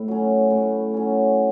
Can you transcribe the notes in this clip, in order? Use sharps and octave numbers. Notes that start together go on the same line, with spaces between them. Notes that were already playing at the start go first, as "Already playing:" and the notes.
Already playing: A2
F#3 C#4
A2
F#3 C#4